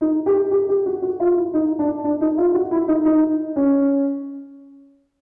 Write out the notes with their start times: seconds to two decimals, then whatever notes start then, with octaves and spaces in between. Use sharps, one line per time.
0.01 D#4
0.26 G4
0.51 G4
0.69 G4
0.86 F#4
1.02 F#4
1.20 F4
1.36 E4
1.54 D#4
1.79 D4
2.04 D4
2.21 D#4
2.38 F4
2.54 F#4
2.71 E4
2.88 D#4
3.05 D#4
3.56 C#4